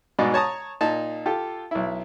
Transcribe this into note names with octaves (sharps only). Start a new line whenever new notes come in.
G#2 B2 D#4 D5 D#5
C#5 A5 A#5 D#6
A#2 D#4 A5
F4 G4 A4
B1 E4